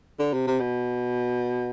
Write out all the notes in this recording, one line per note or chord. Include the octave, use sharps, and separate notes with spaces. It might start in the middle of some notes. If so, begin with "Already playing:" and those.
D3
C3
C3
B2